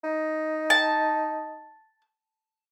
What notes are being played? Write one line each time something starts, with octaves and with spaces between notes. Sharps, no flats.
D#4
A5